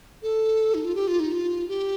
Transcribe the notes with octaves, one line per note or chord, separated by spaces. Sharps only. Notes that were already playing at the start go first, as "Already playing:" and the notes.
A4
D#4
F4
G4
F4
D#4
F4
G4